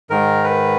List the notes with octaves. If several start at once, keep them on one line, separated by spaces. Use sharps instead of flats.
G#2 D#3 A#4
B4